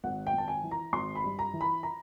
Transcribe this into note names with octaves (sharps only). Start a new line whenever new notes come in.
G#1 F#5
G5
G#1 A5
G#5
E3
A#5
G#1 C6
B5
G2
A#5
E3
B5
A#5